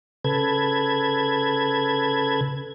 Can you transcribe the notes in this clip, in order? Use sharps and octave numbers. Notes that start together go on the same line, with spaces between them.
C#3 A4 B4 G#6